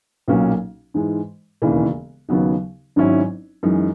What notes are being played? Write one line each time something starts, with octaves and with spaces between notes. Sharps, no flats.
B1 A#2 F#3 A#3 C#4
G#2 E3 G#3
E1 D#2 C#3 E3 A#3
D#2 C#3 F#3 B3 D#4
G#1 G#2 F#3 C#4 E4
F#2 E3 G#3 D#4